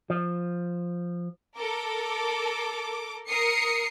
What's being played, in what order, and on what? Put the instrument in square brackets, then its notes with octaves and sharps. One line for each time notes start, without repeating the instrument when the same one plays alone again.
[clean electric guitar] F3
[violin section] A4 A#4 D6
A#4 D#6 C7 C#7